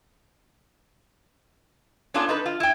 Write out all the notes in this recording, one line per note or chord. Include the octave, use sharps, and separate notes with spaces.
B3 C#4 D4 F4 A4
D#4 A4 B4
F4
E4 G5